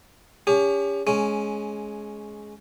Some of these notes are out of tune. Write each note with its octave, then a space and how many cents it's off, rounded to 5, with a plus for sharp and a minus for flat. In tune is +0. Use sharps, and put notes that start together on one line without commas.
C#4 +30 G4 +45
G#3 +15 C#4 +0